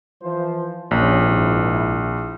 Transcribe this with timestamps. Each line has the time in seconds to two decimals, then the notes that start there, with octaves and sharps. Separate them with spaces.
0.22 E3 F3 C5
0.91 A#1 D#2 C#4
1.24 G#1 E4